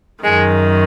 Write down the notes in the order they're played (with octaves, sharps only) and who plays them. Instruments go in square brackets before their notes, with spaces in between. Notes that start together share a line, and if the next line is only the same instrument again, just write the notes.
[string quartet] F#2 D#3 G#3